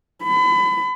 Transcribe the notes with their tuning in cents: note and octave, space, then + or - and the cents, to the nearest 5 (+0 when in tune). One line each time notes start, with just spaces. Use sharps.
B5 +35